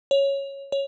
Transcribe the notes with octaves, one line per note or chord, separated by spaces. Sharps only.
C#5
C#5